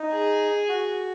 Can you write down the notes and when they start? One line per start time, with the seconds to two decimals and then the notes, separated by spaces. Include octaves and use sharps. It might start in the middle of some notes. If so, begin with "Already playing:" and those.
Already playing: D#4
0.12 G#4
0.69 F#4